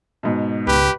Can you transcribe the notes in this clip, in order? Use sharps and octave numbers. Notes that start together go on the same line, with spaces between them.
G#2 B2
C#2 G4 B4